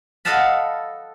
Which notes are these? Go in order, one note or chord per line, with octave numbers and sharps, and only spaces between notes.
A4 D#5 F5 F#5 A5 B5